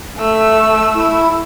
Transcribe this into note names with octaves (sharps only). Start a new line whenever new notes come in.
A3 E6
E4